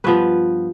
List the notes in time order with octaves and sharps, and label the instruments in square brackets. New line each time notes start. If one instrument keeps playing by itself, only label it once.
[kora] G2 F3 B3 B4